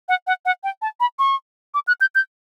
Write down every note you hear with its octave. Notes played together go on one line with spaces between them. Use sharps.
F#5
F#5
F#5
G5
A5
B5
C#6
D6
F#6
G6
G6